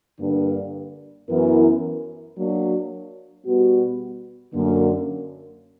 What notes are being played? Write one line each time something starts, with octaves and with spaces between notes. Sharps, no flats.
G2 D3 A#3 D4
F#2 E3 B3 E4 A#4
F#3 A#3 D4 F#4
B2 G3 B3 F#4
F#2 D3 A#3